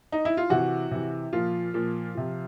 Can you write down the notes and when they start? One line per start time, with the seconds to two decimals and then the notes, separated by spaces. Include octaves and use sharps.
0.12 D#4
0.25 E4
0.37 F4
0.50 C3 E3 F#4
0.91 C3 E3
1.33 A#2 F3 F4
1.74 A#2 F3
2.15 C3 F3